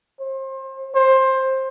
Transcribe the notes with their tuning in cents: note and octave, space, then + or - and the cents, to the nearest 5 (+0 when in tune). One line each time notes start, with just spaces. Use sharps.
C5 +30
C5 +15